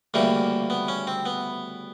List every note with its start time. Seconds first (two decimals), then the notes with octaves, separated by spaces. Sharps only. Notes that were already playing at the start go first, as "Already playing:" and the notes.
0.14 D2 C#3 E3 G3 A#3
0.70 B3
0.88 C#4
1.07 C4
1.26 B3